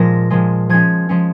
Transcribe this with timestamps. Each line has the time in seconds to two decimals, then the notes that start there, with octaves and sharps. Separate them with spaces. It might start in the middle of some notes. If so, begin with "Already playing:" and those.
Already playing: A#2 F3 G#3 A#6
0.30 A#2 F3 G#3
0.69 F3 G#3 C#4 G#6
1.09 F3 G#3 C#4